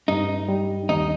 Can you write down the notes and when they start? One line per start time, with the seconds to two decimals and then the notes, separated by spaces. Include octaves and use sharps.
0.08 G2 D#4
0.48 G3
0.89 D#2 D#4